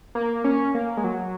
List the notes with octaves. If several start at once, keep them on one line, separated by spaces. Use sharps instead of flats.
A#3
C#4
A#3
G#3
F#3